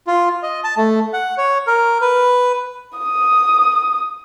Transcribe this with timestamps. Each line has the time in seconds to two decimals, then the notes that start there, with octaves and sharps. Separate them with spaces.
0.07 F4
0.43 D#5
0.64 A5
0.77 A3
1.13 F#5
1.38 C#5
1.67 A#4
2.01 B4
2.98 D#6